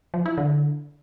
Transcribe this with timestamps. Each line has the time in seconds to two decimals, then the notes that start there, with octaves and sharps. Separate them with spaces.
0.14 F3
0.26 E4
0.38 D3